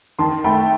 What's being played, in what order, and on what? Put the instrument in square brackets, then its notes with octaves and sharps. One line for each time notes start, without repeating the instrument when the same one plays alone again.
[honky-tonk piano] D#3 [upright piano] A5 C6
[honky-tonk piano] A3 [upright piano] G5 B5